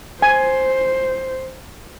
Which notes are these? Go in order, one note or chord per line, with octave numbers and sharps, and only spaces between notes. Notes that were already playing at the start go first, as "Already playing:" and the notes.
C5 G#5